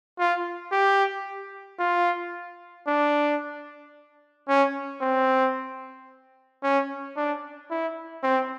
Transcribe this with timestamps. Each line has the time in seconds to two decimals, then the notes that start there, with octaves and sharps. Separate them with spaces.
0.19 F4
0.72 G4
1.79 F4
2.87 D4
4.49 C#4
5.01 C4
6.63 C#4
7.17 D4
7.71 E4
8.23 C4